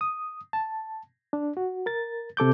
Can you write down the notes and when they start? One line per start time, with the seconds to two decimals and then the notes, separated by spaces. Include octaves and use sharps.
0.01 D#6
0.53 A5
1.33 D4
1.57 F#4
1.86 A#4 A6
2.37 C3 A4 D6 G6